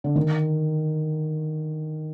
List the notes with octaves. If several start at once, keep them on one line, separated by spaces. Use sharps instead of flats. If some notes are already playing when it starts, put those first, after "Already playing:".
D3
D#3